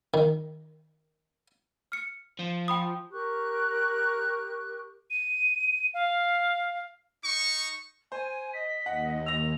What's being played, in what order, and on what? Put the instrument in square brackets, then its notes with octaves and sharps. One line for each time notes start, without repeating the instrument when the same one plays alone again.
[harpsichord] D#3
[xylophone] F6 C#7
[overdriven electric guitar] F3
[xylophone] G5 B5 D#6
[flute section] G4 A#4 C#6 F#6
[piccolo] D#7
F5
[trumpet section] D#4 C#6
[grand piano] C5 [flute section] G#5
[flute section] D#5 [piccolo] B6
[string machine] D#2 [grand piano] F#5
[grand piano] E6 A#6 [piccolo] F7